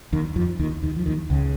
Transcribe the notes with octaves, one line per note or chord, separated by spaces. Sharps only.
D#2 D#3
F2 F3
D#2 D#3
D#2 D#3
F3
D#2 D#3
C#2 C#3